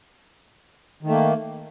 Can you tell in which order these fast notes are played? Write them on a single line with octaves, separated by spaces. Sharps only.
D#3 A3 A#3